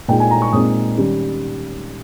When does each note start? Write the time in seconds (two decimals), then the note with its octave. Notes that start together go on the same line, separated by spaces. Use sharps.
0.08 A#2 G#3 D#4 G5
0.20 G#5
0.31 A#5
0.42 C#6
0.52 A#2 G#3 C4 D#4 D#6
0.97 D#3 G3 C#4